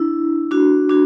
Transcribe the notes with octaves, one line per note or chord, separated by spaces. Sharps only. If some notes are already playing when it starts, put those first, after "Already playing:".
Already playing: D4 E4
D4 F#4
D4 F#4